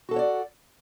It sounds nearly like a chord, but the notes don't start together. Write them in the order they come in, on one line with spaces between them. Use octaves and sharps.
F#4 A4 F#5 C#5 D5